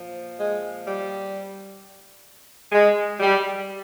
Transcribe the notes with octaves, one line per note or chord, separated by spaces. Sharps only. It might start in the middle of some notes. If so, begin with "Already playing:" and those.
Already playing: A#2 F3
G#3
G3
G#3
G3